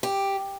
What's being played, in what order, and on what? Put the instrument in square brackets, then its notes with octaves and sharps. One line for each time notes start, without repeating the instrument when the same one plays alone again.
[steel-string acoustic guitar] G4